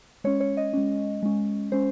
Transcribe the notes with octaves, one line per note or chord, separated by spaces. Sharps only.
G#3 C#4 C#5
C#5
D#5
G#3 C#4
G#3 C#4
G#3 C#4 C5